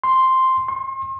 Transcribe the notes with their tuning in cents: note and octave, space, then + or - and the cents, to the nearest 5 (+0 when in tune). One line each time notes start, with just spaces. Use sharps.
C6 +0
C6 +40